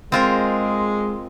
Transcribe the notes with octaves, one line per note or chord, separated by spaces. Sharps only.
G#3 C4 F4 A#4